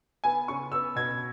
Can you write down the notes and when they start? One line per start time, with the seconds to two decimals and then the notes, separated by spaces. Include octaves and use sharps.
0.24 B3 G#5
0.48 C#3 C#6
0.72 B3 E6
0.96 B2 G#6